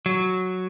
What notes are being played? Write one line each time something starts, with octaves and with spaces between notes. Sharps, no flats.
F#3